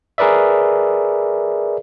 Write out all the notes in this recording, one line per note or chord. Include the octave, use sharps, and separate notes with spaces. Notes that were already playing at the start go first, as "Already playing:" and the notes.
G#4 A#4 B4 D5 E5